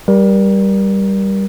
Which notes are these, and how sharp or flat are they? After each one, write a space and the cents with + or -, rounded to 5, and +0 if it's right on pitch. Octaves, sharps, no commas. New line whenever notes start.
G3 +0 A#4 +30